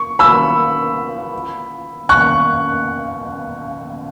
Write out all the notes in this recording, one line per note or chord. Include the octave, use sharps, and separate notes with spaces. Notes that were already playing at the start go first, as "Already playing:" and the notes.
Already playing: C#6
B5 E6
C#6 F#6